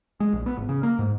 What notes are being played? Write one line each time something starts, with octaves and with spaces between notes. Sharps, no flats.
G#3
A#1
B3
G#1
C#3
A#3
G#2